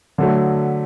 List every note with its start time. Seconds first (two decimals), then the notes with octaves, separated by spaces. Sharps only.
0.18 D3 F#3 A3